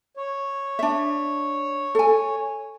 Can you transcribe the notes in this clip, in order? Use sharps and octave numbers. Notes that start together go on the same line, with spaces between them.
C#5
D4 E5
A4 G#5